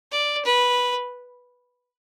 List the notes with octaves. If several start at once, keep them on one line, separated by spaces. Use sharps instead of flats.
D5
B4